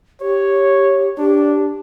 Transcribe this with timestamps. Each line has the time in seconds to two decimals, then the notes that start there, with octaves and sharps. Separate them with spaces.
0.21 G4 C#5
1.18 D4 G4